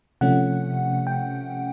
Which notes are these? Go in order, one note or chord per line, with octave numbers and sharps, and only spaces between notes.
C3 F3 A3 C#4 F#5
G5